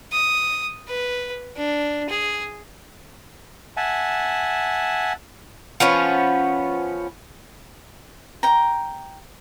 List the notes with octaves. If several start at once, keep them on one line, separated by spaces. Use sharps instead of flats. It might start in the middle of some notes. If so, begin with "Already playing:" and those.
D#6
B4
D4
G#4
E5 F#5 G#5 A5
F3 B3 C#4
G5 A#5